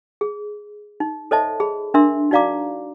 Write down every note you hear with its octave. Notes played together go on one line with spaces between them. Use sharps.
G#4
D#4
A4 C5 C#5 D#5 E5 A5
G#4 B5
D4 A#4 E5 C6
D#4 F#4 D5 F5 A#5 D6